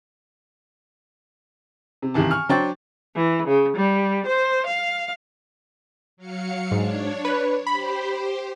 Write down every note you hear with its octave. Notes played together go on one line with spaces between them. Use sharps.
C3
C2 G2 D#3 E3 A5
G#5 C#6 F6
F#3 D4 C5 G5 C#6 A6
E3
C#3
G3
C5
F5
F#3 F5 C#7
G#2 D4 C#5
B4
G4 C5 B5